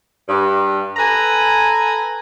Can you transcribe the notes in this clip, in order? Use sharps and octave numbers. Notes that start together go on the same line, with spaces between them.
G2
A4 B4 G#5 A#5